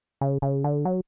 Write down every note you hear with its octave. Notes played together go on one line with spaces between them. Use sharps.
C#3
C#3
D3
F#3